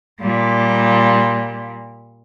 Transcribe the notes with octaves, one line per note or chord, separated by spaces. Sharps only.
A#2 G3